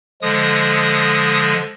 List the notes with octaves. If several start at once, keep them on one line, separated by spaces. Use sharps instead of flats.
D3 F3 G#3 D#6